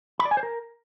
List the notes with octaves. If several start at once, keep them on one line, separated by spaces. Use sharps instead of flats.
B5
D5
G#5
C5
A#4